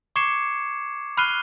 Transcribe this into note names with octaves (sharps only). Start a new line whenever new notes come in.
C#6 D6 G#6 C7 C#7 E7
B5 F6 F#6 C7 D#7 G7